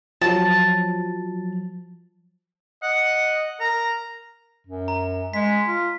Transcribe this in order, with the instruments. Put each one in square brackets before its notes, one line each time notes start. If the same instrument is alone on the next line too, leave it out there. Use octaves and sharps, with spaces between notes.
[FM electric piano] F3 F#3 [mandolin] A5
[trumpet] D#5 [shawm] F#5
[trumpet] A#4 [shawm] A#5
[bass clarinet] F#2
[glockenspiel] A#5
[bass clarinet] G#3 [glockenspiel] B6
[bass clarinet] F4